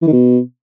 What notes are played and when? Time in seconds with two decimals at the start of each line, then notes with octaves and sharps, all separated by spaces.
0.02 E3
0.07 D#3
0.12 B2